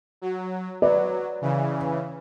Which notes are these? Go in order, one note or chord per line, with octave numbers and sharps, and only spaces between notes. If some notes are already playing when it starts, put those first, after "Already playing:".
F#3
F#3 B4 D5
C#3 E3